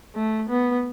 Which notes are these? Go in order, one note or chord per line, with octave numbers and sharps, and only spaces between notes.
A3
B3